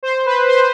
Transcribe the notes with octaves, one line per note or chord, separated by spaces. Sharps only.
C5
B4
C5